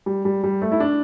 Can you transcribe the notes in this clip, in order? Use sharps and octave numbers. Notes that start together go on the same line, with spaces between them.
G3
G3
G3
A3
E4
D4